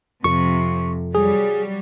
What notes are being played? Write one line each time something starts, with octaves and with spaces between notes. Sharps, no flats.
F2 C3 F3 C#6
F#3 G3 G#4